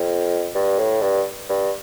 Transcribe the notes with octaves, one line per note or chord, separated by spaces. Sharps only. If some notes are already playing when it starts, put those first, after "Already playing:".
Already playing: F2
G2
A2
G2
G2